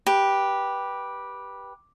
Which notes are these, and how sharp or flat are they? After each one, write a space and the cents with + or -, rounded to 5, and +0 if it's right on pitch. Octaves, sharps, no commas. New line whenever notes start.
G4 +0 B4 -15